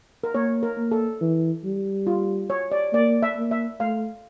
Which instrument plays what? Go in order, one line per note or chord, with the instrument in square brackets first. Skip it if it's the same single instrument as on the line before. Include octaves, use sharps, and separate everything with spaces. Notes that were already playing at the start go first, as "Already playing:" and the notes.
[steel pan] A#4
[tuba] A#3 [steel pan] C#5
[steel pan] A#4
[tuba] A#3
[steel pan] A4
[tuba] E3
G3
[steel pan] F4
C#5
D5
[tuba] A#3 [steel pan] D5
[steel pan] E5
[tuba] A#3
[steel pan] E5
[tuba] A3 [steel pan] F5